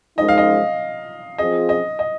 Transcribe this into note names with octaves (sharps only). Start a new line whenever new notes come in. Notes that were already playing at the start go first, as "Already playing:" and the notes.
F#2 F3 G#3 D#4 D#5
F5
D#5
F3 C4 F4 G#4 D#5
D#5
D#5